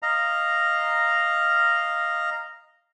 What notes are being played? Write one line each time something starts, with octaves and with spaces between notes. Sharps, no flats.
D#5 F5 A#5